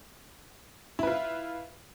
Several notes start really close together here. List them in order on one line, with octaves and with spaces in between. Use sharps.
E4 B4 F4